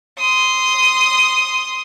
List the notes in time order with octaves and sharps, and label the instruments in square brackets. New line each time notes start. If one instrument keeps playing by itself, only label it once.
[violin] C6 D#6